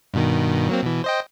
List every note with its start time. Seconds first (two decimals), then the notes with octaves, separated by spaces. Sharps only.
0.14 G2 B2 D#3
0.69 F#3 A#3 C4
0.82 B2 E3
1.04 C5 D#5 G5